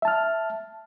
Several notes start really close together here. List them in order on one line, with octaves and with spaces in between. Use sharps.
E5 A5 F6